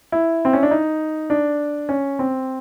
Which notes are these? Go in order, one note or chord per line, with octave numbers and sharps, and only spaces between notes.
E4
C4
C#4
D4
D#4
D4
C#4
C4